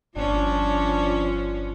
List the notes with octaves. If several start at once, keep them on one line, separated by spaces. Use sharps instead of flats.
G1 F3 C#4 D4